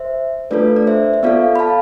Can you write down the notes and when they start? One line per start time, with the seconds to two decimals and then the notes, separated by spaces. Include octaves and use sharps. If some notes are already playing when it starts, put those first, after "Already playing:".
Already playing: C5 E5
0.51 A3 D4 F4 A4 B4 D5
0.76 D5
0.87 C5 E5
1.13 E5
1.23 B3 F4 A4 D5 F5
1.56 B5
1.59 F5 A5